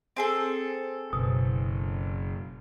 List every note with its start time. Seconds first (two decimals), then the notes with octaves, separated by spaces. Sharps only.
0.16 C4 G#4 A4
1.13 F#1 B2